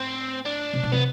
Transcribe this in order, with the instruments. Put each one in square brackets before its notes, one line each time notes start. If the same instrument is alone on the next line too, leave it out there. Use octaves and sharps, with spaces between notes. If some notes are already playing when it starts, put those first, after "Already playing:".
Already playing: [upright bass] A2 [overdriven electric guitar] C4
[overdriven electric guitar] D4
[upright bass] C3
B2
[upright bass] C3 [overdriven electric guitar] B3